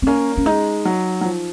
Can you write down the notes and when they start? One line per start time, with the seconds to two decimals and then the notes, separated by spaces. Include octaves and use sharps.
0.02 C4
0.07 A#3 C#4
0.37 C#4
0.46 G#3 D#4
0.85 F#3
1.21 F#3
1.25 F3